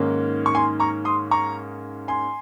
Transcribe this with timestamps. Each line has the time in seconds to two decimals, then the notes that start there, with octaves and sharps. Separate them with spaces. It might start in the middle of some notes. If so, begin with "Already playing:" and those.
Already playing: G#2 D#3 A#3 C#4
0.46 C#6
0.55 G#5 C6
0.80 A#5 C#6
1.05 C6 D#6
1.31 A#5 C#6
2.08 G#5 C6